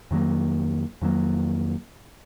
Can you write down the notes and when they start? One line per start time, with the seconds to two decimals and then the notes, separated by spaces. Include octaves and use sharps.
0.11 F2 D#3 F#3 A#3
1.02 F2 D#3 F#3 A#3